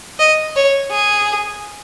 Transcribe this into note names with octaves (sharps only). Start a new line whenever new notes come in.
D#5
C#5
G#4